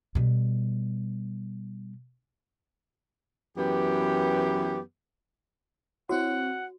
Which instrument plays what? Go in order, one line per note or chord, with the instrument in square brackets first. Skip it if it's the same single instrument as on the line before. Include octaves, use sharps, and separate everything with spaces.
[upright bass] B2 G3
[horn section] F#2 E3 B3 G4
[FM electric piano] C4 E4 C#5 [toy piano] F#4 [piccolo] F#5